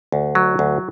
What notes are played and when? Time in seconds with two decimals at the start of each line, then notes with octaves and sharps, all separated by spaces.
0.12 D2
0.35 F#3
0.59 D2